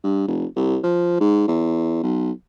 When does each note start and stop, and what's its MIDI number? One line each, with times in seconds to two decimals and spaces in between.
0.04 0.26 43
0.28 0.46 29
0.56 0.78 36
0.84 1.20 53
1.20 1.45 44
1.48 1.99 40
2.03 2.31 35